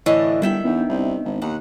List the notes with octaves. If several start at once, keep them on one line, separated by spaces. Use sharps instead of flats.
A2 D3 E3 C#5 D#5
G1 D#3 G3 E4 E5 G5
E2 B3 D4 D#4
C2
G#1
D#2 F#5